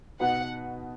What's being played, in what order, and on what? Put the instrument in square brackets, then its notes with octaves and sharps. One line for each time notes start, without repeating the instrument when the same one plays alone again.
[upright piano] B2 B3 D#4 F#4 B4 [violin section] F#5